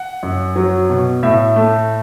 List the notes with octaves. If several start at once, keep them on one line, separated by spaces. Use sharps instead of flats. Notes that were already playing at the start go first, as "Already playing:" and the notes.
Already playing: F#5
F#2
F#3
B2
A2 E5
A3